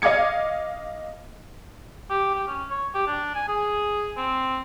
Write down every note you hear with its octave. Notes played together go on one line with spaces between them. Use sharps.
D#5 F5 D6 G#6 C#7
G4
G4
C#4
C#5
G4
D4
G#5
G#4
C4